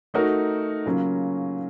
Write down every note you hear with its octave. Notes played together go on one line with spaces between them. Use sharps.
A3 D#4 F#4 A#4
C#3 F#3 A#3 C#4 F4